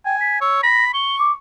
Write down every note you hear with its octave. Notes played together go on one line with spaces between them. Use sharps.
G5 G#5
B6
C#5 E6
B5 A#6
C#6 G7
D6